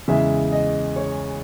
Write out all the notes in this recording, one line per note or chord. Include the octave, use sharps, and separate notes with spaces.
E2 C#3 G#3 E5
D#5
C#5